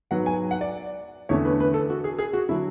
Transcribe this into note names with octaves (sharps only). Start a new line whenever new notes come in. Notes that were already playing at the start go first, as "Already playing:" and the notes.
G#2 F#3 B3 F#5
G#5
F#5
D5
E2 D3 A3 C#4 C#5
B4
B4
A4
F#4
G#4
G#4
F#4
D3 F#3 E4